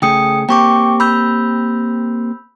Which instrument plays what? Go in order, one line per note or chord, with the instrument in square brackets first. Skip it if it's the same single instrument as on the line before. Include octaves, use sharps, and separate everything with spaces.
[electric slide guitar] C#3 A3 G#4 [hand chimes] G5 D#6 C#7
[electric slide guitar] A#3 C4 G4 [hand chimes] G5 C#6 D6
[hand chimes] B5 E6 G6